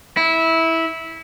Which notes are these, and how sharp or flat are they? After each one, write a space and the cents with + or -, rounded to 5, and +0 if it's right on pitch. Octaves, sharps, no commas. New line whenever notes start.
E4 -15